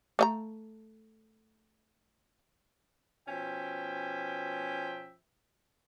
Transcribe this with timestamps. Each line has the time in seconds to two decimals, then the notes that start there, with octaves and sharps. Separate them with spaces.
0.19 A3 D#5 A#5
3.28 B2 F3 C#4 E5 G5